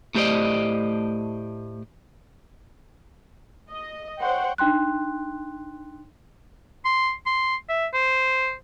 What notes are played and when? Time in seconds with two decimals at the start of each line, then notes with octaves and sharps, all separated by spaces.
0.15 A2 A3 G4 C5 D5 D#5
3.71 D#5
4.20 C5 C#5 F#5 G5
4.58 D4 D#4 G5 C6 F#6
6.85 C6
7.26 C6
7.69 E5
7.94 C5